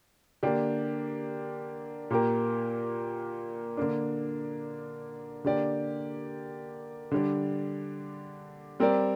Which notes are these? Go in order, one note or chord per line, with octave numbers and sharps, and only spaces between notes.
D3 A#3 D4 G4
A#2 A#3 G4 A#4
D3 A#3 D4
D3 A#3 G4 D5
D3 G3 D4
G3 C4 A#4 D5